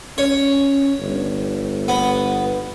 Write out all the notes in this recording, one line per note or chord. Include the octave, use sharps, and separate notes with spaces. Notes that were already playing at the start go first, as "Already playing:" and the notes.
C#4 C#5
G1
B3